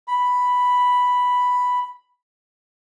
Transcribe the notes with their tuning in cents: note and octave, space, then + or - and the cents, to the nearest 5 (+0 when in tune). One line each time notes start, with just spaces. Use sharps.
B5 +0